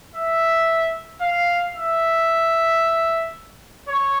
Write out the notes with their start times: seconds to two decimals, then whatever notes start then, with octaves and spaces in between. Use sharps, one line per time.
0.15 E5
1.21 F5
1.75 E5
3.88 C#5